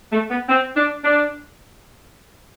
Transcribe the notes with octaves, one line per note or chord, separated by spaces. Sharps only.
A3
B3
C4
D4
D4